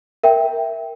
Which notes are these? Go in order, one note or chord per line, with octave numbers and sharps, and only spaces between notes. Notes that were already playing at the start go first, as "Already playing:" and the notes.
A#4 E5 G5